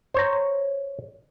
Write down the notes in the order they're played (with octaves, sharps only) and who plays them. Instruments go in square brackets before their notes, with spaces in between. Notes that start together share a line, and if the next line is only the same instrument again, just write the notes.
[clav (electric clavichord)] C5 C#5 A#5